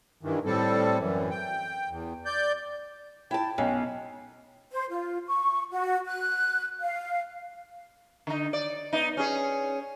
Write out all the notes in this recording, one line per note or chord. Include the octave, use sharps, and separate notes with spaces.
G2 D#3 E3
A2 G3 C4 A4
F#2 E3
G5
E2
D5 G6
E4 G5 A5
B1 C#4
C5
F4
C#6
F#4
F#6
F5
D3 D#4
D5
B3 D#4
C#4 G#4